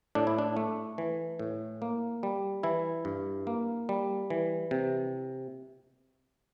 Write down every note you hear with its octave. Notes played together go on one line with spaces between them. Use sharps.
A2 D4
E4
D4
A3
E3
A2
A#3
G3
E3 E4
G2
A#3
G3
E3
C3